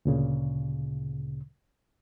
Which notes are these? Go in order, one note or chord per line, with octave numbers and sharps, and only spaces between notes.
D2 A#2 C#3